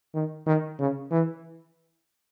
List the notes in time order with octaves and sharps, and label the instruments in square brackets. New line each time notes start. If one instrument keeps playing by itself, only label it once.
[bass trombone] D#3
D#3
C#3
E3